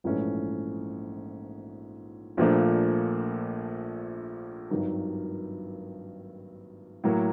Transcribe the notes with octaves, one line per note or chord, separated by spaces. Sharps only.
A#1 G#2 E3 A3 C#4
A#1 A#2 F3 A3 D4
G#1 G2 D#3 F#3
A2 F#3 A#3